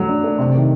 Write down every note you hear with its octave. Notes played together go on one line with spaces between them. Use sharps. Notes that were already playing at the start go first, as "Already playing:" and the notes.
Already playing: F#3 A3
D4
A3
C3
D#3